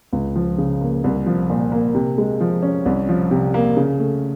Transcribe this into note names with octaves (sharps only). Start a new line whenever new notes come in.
C#2
F3
C#3
A#3
C2
F3
A#2
A#3
C3
G#3
F3
C#4
C2
F3
C3
A#3
C#3
A3